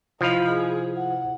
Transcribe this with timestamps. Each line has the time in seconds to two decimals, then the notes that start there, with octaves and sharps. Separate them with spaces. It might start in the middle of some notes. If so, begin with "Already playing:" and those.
0.21 C3 F3 E4 C5 D#5 F5 B5
0.51 G#4
0.97 F#5